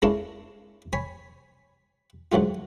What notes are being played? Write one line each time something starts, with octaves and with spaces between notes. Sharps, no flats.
G#3 A#3 C#4 D4 E4 A4
C#5 G#5 B5
D2 G#2 F#3 A3 F4